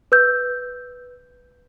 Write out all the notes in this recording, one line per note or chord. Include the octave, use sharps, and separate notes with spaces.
B4 E6 G6